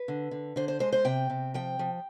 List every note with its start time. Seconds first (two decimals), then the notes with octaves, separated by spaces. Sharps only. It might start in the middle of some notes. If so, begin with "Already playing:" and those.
Already playing: B4
0.08 D3
0.31 D3
0.56 D3 C5
0.68 C5
0.80 G#3 C5
0.92 C5
1.05 C3 G5
1.30 C3
1.54 F3 G5
1.79 F3